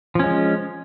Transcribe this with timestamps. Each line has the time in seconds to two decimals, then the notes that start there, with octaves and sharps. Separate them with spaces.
0.15 F3
0.19 C#4
0.24 G#3